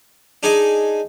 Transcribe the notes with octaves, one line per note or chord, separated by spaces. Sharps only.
D4 D#4 G#4